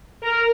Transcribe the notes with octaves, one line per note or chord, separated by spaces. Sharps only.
A#4